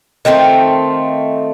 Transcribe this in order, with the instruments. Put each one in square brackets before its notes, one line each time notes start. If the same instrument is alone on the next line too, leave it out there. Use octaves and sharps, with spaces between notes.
[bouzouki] D#3 A3 C4 F4